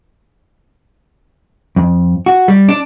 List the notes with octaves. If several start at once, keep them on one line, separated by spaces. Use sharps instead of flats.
F2
F#4
G3
D4